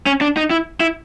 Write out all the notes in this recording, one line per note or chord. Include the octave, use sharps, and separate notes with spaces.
C#4
D4
D#4
E4
E4